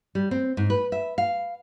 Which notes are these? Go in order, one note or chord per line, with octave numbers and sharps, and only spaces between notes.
G3
C4
G#2
B4
E5
F5